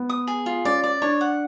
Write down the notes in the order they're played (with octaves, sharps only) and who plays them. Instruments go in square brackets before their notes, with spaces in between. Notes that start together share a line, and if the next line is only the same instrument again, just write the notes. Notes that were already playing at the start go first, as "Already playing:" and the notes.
Already playing: [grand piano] B3
[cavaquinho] D#6
G#4
F4
[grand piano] C#4 [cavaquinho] D5
[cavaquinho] D5
[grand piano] D4 [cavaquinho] C#5
[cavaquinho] F#5